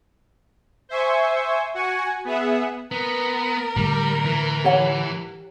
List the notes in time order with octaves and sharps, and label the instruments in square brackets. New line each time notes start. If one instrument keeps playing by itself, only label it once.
[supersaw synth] C5 E5 G#5 C#6
F#4 F#5 G#5 C#6 C#7
B3 G#4 E5 F#5
[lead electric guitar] B3 [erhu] A#4
[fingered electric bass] A2 D3 A3 [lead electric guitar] G3
[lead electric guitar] E3
[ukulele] G4 C#5 F#5